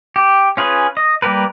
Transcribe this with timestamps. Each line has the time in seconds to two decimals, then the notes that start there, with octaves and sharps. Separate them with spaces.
0.16 G4
0.57 C#4 F4 G#4 B4
0.97 D#5
1.22 G3 A#3 G4 A#4 B4